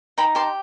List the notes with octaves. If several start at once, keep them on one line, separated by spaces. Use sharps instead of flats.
D#4 G5 B5
G4 A5 C6